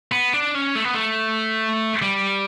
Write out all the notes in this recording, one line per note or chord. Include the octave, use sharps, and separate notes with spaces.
B3
D4
C#4
A3
B3
A3
G3